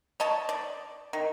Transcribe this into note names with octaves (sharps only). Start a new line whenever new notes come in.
C#5 D#5 A5
D5
D#3